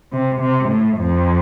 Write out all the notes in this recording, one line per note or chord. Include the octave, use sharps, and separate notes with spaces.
C3
C3
A2
F2